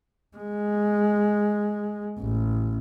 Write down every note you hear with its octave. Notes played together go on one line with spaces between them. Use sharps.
G#3
A1